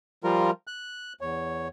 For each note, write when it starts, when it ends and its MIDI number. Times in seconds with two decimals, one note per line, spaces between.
0.24 0.51 53
0.24 0.51 55
0.24 0.51 65
0.24 0.51 70
0.67 1.13 90
1.21 1.68 40
1.21 1.68 73